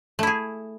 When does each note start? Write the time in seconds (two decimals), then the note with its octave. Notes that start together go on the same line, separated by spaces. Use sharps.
0.19 A3
0.23 E4
0.27 G#4